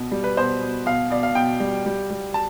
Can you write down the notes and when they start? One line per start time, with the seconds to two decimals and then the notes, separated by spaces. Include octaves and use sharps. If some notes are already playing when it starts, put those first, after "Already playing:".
Already playing: B2
0.12 G3
0.24 B4
0.37 B2 C5
0.61 B2
0.86 B2 F5
1.10 B2 D5
1.23 F5
1.35 B2 G5
1.60 G3
1.86 G3
2.11 G3
2.34 A5